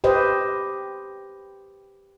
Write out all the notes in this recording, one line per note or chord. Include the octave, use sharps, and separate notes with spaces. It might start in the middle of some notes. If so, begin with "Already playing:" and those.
G4 B4 C5 D#5